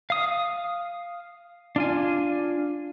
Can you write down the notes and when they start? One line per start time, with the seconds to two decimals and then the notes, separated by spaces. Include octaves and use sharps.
0.10 F5 D#6
1.76 D4 F4 G#5